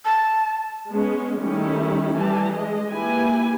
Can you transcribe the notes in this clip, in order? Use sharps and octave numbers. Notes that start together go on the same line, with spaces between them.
A5
G#3 B3 C#4
D#3 G3 A3 C#4 E4
E3 G3 A5
G#3 G#4 D#5
A#3 E4 G4 B4 G#5